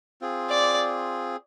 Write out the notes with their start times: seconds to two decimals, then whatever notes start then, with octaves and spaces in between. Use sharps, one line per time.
0.21 C4 F4 G#4
0.50 D5